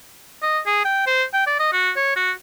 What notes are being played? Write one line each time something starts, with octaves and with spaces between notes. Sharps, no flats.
D#5
G#4
G5
C5
G5
D5
D#5
F#4
C#5
F#4